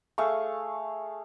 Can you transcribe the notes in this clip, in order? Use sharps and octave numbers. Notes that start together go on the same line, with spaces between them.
A3 G#4 F5 C#6